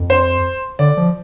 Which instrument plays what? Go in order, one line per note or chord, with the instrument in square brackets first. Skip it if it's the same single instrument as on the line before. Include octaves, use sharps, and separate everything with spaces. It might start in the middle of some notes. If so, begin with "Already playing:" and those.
Already playing: [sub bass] F2
[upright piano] C5
[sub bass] D3 [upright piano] D5
[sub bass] F3